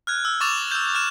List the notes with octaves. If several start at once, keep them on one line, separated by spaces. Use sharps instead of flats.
F6 F#6 G#6
E6
C#6 D6 A6 E7 F7
E6 G6
F6 F#6 E7